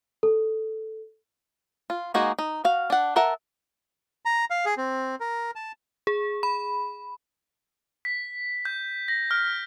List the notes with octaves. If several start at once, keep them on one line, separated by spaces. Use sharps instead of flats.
A4
F4
G#3 A#3 D#4 F#4 G#4
D#4
F#4 F5
D4 F#5
A4 A#4 E5 F#5
A#5
F5
G#4
C4
A#4
A5
G#4
B5
B6
G6
A#6
F6